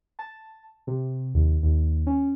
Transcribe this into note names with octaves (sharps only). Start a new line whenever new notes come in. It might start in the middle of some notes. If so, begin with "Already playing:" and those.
A5
C3
D#2
D#2
C#4